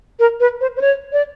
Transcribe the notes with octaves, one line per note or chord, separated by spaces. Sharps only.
A#4
B4
C5
C5
C#5
D5